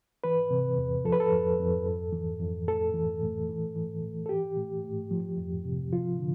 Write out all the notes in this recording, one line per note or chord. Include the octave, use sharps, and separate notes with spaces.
E3 B4
C3
E2
F3 A4
B4
A4
F2
F2
F2
E3
F2
A2 A4
E3
A2
E3
E3
A2
A4
E3 G4
A2
A2
F3
F2
C3
F3 F4
D3